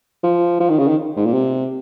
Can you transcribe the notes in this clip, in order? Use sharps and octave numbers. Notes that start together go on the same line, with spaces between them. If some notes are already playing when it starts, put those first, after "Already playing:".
F3
F3
D#3
C#3
D#3
G#2
A#2
C3